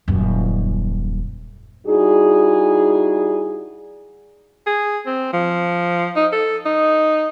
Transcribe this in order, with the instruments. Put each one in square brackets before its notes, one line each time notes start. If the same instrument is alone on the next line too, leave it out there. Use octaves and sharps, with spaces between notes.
[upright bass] D#1 F#2
[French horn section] G3 D#4 E4 F#4 G#4
[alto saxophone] G#4
C4
F3
D#4
A4
D#4